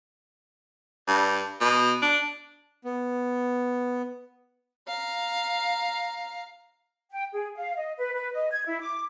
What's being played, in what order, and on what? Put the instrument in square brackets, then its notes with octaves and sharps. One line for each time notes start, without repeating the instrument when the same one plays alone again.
[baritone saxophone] G2
B2
D4
[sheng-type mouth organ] B3
[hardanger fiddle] F5 A#5
[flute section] G5
G#4
F5
D#5
B4
B4
D#5
G#6
E4
D6